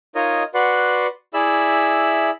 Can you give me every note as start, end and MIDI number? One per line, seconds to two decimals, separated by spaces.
0.15 0.43 63
0.15 0.43 65
0.15 0.43 70
0.15 0.43 73
0.15 0.43 75
0.54 1.07 66
0.54 1.07 71
0.54 1.07 74
0.54 1.07 78
0.54 1.07 84
1.34 2.30 64
1.34 2.30 68
1.34 2.30 74
1.34 2.30 76
1.34 2.30 83
1.34 2.30 88